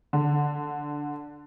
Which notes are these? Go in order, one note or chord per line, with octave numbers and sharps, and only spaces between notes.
D3